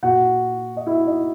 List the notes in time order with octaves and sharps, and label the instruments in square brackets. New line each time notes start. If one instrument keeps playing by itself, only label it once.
[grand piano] A#2 F#4 F#5
D#5
E4 E5
D#4 D#5